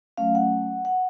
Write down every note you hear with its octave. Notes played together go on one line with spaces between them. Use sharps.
F#3 A3 C#4 F5
F#5
F#5